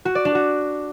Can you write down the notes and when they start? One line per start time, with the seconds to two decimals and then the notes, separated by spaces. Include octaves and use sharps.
0.05 F#4
0.15 D5
0.25 D4
0.35 F#4